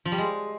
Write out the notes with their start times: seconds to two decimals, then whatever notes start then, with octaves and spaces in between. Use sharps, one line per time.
0.05 F3
0.12 G3
0.18 G#3